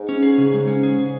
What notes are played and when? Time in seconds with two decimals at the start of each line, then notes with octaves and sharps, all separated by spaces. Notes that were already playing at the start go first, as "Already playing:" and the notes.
Already playing: G#2
0.09 C#4
0.23 G#4
0.38 C#3
0.54 G#3
0.68 C#4
0.83 G#4
0.98 C#3